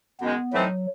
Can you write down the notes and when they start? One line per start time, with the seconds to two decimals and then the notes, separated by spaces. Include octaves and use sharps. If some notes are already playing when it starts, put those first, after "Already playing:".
0.20 F#2 D#3 G#3 B3
0.52 A2 E3 F#3 A3 C4 D#4